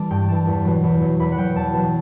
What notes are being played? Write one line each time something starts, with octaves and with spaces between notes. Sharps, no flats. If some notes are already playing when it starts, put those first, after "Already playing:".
Already playing: E3 G3 A5 D6
G2 G5
E3 G3 A5
E2
B2 F#3
E2
B2 F#3
E2 B5
F#5
B2 F#3 G5
E2 A5
B2 F#3